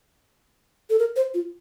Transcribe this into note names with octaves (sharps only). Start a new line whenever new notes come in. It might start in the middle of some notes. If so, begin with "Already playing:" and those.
A4
A#4
C5
F4